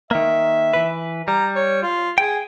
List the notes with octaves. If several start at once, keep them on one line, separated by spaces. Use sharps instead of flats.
D#3 A#3 E5
E3 B4
G3 A#5
C#5
F4
G#4 G5